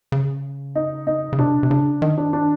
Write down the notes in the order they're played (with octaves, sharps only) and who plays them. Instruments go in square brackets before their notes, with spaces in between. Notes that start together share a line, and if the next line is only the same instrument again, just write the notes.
[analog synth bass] C#3
[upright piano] D#4
D#4
[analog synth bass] C#3
[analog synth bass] C3 [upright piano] D4
[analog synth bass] C3
[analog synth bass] C#3 [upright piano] D4
[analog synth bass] D#3 [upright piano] D#4
[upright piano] D4
D4